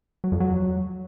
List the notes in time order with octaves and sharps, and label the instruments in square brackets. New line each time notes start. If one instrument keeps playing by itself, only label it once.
[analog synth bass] F#3
F2
F#3